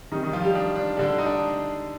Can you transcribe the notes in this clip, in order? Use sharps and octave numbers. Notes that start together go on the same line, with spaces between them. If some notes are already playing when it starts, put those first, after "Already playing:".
C3 D#3 G3 D#4
D#3 D#4
F3 F4
G3 G4
D4
D4
D3 G3 D4
D#4
D4